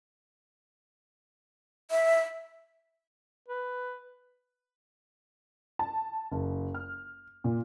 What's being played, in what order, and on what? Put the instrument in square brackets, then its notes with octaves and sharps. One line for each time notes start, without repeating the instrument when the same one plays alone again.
[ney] E5
[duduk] B4
[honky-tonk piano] A5
F#1
F6
A#2